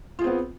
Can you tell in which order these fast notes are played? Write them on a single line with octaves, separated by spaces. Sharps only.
F4 G#4 C4 B3